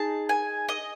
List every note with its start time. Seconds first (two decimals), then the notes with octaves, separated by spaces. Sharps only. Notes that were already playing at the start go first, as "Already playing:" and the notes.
Already playing: D#4 G#4 A5
0.29 G#5
0.69 D#5